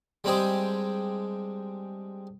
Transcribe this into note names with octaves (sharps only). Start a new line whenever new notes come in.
G3 G#3 C4 D4 G4 G#4